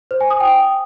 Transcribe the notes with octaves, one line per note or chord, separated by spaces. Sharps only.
C5
G#5
D#6
G5